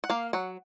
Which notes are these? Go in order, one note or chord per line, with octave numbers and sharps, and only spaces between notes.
F#5
A#3 F5
F#3 F#5